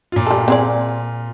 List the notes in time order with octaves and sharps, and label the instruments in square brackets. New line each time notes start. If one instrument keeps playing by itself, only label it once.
[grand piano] A#2 F4
[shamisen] G3 A4
C4 G#4 D5